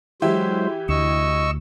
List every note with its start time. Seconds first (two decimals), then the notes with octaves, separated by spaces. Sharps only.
0.22 E3 F#3 G#3 G4 C5 E5
0.89 D2 D#5 C#6 E6